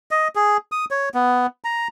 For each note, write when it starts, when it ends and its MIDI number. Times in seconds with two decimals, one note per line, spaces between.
0.11 0.28 75
0.35 0.57 68
0.72 0.85 87
0.91 1.09 73
1.14 1.47 59
1.64 1.88 82